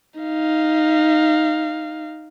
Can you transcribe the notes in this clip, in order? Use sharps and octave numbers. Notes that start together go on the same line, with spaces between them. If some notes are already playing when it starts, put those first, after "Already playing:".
D#4 F5